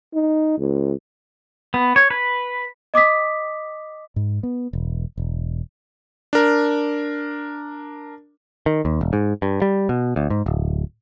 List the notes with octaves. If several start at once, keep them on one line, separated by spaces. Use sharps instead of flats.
D#4
C#2
B3
C#5
B4
D#5 D6 D#6 B6
G#2
B3
E1
E1
D4 A#4
D#3
D#2
E1
G#2
G2
G3
B2
D2
G#2
D1